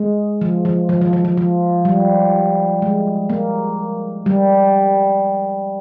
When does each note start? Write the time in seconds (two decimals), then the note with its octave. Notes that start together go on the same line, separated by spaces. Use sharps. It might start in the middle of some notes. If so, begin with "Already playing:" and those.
Already playing: G#3
0.41 F3
0.65 F3
0.89 F3
1.01 F3
1.13 F3
1.25 F3
1.37 F3
1.85 G3
2.82 G#3
3.30 A#3
4.26 G3